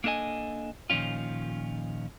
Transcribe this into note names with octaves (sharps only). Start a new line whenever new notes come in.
A#3 D4 A4 D#5 G#5
A#2 D#3 F3 C#4 F4